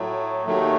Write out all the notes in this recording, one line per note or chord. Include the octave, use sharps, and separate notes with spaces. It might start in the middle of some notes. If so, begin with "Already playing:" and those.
Already playing: A2 F#3 A3
D#2 D#3 F#3 A3